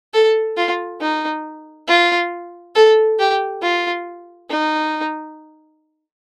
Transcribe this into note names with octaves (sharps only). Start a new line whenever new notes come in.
A4
F4
D#4
F4
A4
G4
F4
D#4